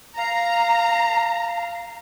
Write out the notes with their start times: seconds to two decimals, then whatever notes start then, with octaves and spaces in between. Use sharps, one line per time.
0.17 F5 A#5